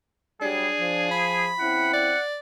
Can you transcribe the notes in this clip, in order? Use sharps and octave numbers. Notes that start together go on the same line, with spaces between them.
F#3 G3 D4 G#4
F3
B5
C#3 C4 E4 F#5
D5